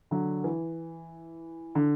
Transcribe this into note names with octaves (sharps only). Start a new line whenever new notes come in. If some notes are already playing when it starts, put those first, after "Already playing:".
D3 F#3
E3
D3